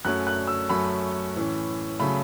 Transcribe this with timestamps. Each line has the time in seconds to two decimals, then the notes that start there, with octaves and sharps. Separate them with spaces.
0.05 F#2 F#3 A3 C#4 F#6
0.27 F#6
0.47 E6
0.69 F#2 F#3 A3 C#4 B5
1.35 A2 E3 C#4
1.99 C#3 F#3 A3 C#4 B5